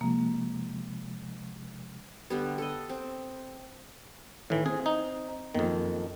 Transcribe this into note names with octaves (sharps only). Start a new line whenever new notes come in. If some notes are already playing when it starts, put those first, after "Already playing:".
C3 F3 G#3 A#3
D3 G3 B3
A4 D#5
C4
A2 D#3 E3
C4 G#4
D#4
F#1 F2 D#3